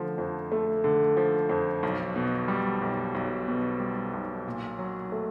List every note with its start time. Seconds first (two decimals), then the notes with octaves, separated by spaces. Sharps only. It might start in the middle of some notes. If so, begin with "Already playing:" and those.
Already playing: D3 F3 A3
0.18 F2
0.52 A3
0.84 D3
1.17 F3
1.49 F2
1.83 B1
2.16 B2
2.48 G3
2.82 B1
3.15 B1
3.48 B2
3.80 G3
4.14 B1
4.47 A#2
4.79 F#3
5.12 A3